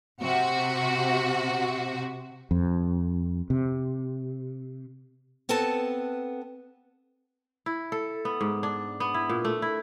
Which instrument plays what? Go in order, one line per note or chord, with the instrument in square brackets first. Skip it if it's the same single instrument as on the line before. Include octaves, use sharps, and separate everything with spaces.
[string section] C3 F#4
[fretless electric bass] F2
C3
[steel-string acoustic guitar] B3 C4 A4 B4 A5
[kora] E4
A4
B3
G#2
D4
B3
E4
A#2
A3
E4